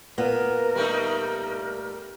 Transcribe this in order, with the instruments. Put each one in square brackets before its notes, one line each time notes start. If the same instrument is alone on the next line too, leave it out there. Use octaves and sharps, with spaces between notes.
[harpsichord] A#2 [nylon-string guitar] B3 [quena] A#4
[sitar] G3 A3 D#4